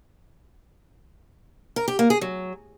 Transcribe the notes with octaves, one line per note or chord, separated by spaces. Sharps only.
A#4
G4
A#3
G#4
F#3